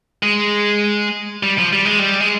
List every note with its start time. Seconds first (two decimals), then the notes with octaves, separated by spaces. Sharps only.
0.23 G#3
1.43 G3
1.58 F3
1.73 G3
1.85 G#3
1.99 G3
2.21 G#3